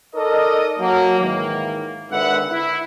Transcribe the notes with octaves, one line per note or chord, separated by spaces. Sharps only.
D#4 A4 A#4 D5 D#5
F#3 A#3
G#2 D#3 E3 A#3
G#1 D3 B4 E5 F#5
E4